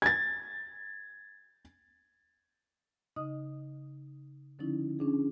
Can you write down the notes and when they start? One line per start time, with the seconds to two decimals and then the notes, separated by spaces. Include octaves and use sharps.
0.02 G#6 A6
3.16 C#3 D#4 D#5 D#6
4.59 D3 F3 C#4 D#4 E4
4.99 C#4 D4 G#4